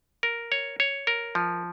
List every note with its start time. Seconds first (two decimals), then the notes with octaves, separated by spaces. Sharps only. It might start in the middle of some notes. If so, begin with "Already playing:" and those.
0.23 A#4
0.52 C#5
0.80 C#5
1.07 A#4
1.35 F3